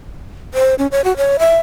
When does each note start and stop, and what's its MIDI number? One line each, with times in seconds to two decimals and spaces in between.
0.54 0.75 72
0.79 0.87 61
0.92 1.01 73
1.04 1.16 66
1.17 1.37 73
1.39 1.60 76